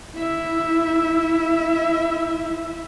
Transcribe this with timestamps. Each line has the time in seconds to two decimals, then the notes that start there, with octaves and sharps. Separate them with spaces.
0.17 E4 E5